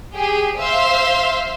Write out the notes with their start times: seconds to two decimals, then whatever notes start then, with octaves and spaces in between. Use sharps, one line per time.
0.14 G4 G#4 G5
0.59 C5 E5 F5 C6